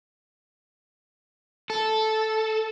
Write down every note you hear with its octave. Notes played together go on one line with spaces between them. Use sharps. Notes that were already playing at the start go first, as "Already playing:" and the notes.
A4